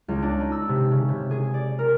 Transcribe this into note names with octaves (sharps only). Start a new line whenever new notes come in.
C#2
D4
D#4
E6
C3
C#3
C3
G#4
D5
A#4